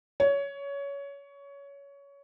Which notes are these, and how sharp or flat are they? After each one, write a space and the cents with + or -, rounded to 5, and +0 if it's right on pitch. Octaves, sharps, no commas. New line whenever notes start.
C#5 +20